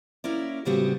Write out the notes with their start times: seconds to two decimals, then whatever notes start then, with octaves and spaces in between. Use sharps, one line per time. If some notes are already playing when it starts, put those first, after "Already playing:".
0.24 A#3 C#4 E4 A#4 D5
0.65 A2 C#3 G3 B3 C4 F#4